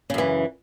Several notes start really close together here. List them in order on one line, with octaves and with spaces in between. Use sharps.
C#3 F#2 E3